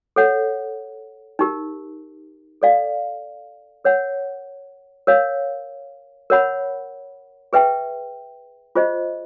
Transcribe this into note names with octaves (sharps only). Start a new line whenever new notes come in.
A4 C#5 F#5
D#4 G4 A#4
A4 D5 F5
A#4 C#5 F#5
A#4 C#5 F5
A#4 C#5 F#5 B5
G#4 B4 E5 G5
F4 G#4 C5 D#5